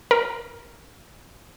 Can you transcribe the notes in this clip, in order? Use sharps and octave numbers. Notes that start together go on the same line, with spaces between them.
A#4